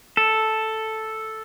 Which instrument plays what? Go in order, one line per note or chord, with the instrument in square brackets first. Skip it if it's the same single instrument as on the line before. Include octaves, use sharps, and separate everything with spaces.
[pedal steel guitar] A4